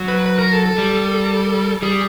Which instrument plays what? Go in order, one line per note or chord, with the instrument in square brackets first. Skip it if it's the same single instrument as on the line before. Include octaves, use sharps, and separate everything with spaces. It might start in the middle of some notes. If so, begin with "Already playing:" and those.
Already playing: [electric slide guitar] F#3
[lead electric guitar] B4
B4
A#4
A4
A4
[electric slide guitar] G3
[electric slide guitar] G3 [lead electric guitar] G#4